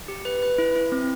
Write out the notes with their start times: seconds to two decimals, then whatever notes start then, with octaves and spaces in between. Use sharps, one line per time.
0.08 G4
0.25 B4
0.43 B4
0.58 E4
0.76 E4
0.92 C4